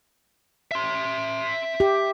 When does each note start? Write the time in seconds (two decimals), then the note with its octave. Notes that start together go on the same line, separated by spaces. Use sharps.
0.71 E5 C6
1.80 G4